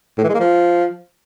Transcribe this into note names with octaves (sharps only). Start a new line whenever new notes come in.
A2
E3
G#3
A#3
F3